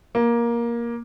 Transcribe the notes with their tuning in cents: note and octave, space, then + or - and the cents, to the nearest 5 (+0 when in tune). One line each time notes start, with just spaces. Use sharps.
A#3 +15